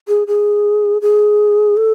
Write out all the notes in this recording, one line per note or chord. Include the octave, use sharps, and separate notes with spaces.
G#4
G#4
G#4
A4